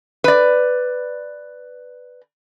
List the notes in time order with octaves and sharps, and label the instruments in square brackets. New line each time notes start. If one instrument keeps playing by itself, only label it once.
[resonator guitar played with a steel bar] B4 D5